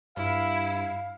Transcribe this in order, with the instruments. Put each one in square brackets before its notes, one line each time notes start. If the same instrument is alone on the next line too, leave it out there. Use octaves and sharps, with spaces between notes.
[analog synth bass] G2 [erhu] E4 [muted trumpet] F5